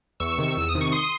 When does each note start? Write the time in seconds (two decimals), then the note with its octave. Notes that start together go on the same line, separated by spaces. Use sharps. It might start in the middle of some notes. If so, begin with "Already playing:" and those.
0.20 E2 C#6 E6
0.38 C3 D#3
0.57 E2 E6
0.69 D#6
0.75 C3 D#3
0.81 C#6
0.92 C6 D#6